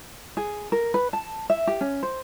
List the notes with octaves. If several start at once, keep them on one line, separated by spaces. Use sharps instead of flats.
G#4
A#4
B4
A5
E5
G4
C#4
C5